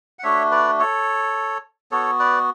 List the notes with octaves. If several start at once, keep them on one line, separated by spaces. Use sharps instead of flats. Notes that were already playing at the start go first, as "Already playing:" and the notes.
F#5
A3 D4 F#4 C#5 E5
B4 D5
A4 C#5
B3 F#4 A4 C#5
B4 D5